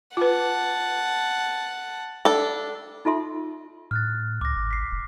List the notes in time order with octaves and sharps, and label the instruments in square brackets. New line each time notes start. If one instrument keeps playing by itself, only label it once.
[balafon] F4 B4 [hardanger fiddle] F#5 A5
[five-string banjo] D4 A4
[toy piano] D#4 F4 A4 E5 C6
[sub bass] A2 [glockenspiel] F6 F#6 A6
[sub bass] C#2 [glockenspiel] D6 A#6
[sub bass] G#1
[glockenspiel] B6 C7
[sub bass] F1